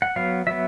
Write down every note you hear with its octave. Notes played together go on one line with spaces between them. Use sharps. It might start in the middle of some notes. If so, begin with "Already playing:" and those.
F#5
F#3 B3 F5
F#3 B3 E5